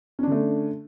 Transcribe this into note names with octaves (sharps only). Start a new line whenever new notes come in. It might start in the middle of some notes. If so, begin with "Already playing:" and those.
D3 A3 C#4 D4